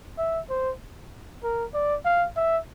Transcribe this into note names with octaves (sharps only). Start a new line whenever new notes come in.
E5
C5
A#4
D5
F5
E5